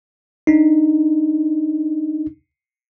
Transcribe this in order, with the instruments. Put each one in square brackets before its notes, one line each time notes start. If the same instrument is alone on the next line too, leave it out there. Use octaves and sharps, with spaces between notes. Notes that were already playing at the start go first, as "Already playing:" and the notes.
[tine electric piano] D4 D#4